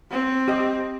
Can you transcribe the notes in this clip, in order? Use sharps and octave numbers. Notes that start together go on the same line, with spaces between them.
C4
G4 D#5